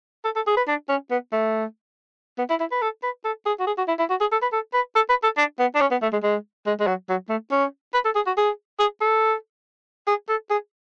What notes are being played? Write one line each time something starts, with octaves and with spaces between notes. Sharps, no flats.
A4
A4
G#4
B4
D4
C#4
B3
A3
B3
E4
E4
B4
A4
B4
A4
G#4
F#4
G#4
F#4
E4
E4
F#4
G#4
A4
B4
A4
B4
A4
B4
A4
D4
B3
D4
C#4
B3
A3
G#3
G#3
G#3
G#3
F#3
F#3
A3
C#4
B4
A4
G#4
F#4
G#4
G#4
A4
G#4
A4
G#4